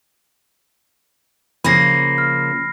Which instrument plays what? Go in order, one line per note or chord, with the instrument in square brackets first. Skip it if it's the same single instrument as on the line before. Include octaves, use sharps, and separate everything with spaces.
[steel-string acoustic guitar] C#3 F3 A#3 [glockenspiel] B5 A#6 C7
[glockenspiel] F6